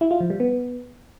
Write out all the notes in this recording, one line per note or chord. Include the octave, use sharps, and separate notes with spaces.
E4
F4
F3
G3
B3